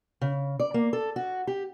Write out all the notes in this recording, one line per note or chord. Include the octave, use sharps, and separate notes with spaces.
C#3
D5
A#3
A4
F#4
G4